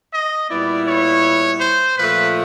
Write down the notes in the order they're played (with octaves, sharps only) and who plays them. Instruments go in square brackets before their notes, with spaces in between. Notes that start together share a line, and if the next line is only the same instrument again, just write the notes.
[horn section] D#5
A#2 G3 B3 E4 D5
C#5
C5
A#2 F3 A3 B4